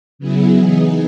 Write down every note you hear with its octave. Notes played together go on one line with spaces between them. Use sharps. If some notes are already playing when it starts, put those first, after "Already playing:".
C#3 F#3 B3 E4 G#4
E3 B3 D#4 G#4